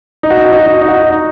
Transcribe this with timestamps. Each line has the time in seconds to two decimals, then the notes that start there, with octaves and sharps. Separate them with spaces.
0.23 D#4
0.30 F#4
0.37 D#4
0.45 F#4
0.52 D#4
0.59 F#4
0.66 D#4
0.73 F#4
0.81 D#4
0.88 F#4
0.95 D#4
1.03 F#4
1.10 D#4